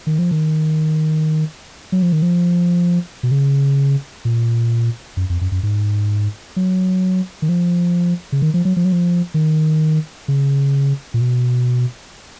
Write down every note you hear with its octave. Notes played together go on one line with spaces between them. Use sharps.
D#3
F3
D#3
F#3
F3
D#3
F3
B2
C#3
A#2
F#2
F2
F#2
F#2
G#2
F#3
D#3
F3
C#3
D#3
F3
F#3
F3
F#3
F3
D#3
C#3
A#2
B2